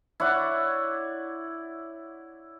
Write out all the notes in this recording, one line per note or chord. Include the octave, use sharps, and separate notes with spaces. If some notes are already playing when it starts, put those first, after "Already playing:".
E4 C#5 D5 F#5